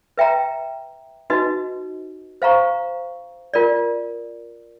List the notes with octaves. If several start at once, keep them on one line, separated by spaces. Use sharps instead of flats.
B4 E5 G5 A#5
D#4 F#4 B4 D#5
C5 F5 A#5 C#6
F4 A#4 D5